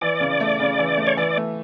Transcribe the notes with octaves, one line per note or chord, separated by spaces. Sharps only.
E3 D5
C#3
A3
C#3
E3
A3
C#5
E3 D5
A3